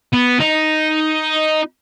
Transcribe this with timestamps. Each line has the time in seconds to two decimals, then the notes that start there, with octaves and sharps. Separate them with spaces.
0.13 B3
0.40 D#4